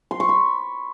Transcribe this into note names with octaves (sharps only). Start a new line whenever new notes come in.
C6
C#6
B5